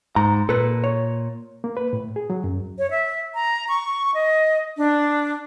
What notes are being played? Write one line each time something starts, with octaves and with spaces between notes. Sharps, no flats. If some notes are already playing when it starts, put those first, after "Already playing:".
G#2 A#5
A#2 A4 B4
C#5
A#3
B4
A2
G#4
F#3
F#2
C#5
E5
A#5
C#6
D#5
D4